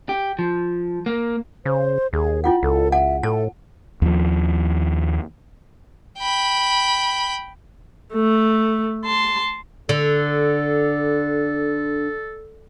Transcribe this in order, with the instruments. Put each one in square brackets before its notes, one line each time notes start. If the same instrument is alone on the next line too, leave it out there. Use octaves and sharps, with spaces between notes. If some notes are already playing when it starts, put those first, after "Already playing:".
[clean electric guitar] G4
F3
A#3
[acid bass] C#3 [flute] C5
[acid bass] D#2 [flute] G#4
[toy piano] E4 F4 F#5 [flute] G5
[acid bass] C#2 [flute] A4
[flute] E5 [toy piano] F#5 A5
[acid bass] A2 [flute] A4 [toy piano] A5
[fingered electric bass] D#2 F3
[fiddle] G5 B5
[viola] A3
A5 C6
[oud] D3 [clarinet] A4